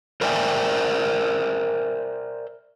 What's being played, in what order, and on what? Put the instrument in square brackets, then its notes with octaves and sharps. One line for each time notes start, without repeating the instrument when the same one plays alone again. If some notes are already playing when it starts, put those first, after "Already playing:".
[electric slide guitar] A#4 C5 D5 E5 G5 G#5